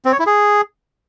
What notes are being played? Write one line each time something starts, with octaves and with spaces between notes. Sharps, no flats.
C4
C#5
E4
G#4